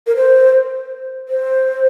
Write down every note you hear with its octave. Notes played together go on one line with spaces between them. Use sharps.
A#4
C5
C5